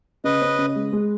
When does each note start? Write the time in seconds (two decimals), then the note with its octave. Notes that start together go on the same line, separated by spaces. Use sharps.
0.24 C#3 B4 D#5
0.41 C#4
0.59 C#3
0.76 G#3
0.93 G#3